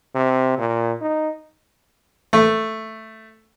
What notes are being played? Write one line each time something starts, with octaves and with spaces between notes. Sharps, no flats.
C3
A#2
D#4
A3